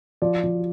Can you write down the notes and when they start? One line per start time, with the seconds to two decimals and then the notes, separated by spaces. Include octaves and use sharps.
0.22 F3 D5
0.44 F3